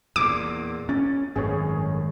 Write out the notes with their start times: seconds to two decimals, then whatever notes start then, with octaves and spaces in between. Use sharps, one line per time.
0.16 E2 A#2 D6 E6
0.89 C#4 A6
1.36 G#1 F#2 A2 G#4 C#5